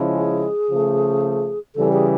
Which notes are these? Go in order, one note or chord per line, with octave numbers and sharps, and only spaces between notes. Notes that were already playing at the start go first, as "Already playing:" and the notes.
Already playing: C#3 F3 G#3 C#4 E4
G#4
C#3 F3 A3
C#3 E3 G3 A4
G#4